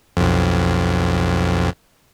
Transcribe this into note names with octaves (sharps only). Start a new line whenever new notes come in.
B1 F2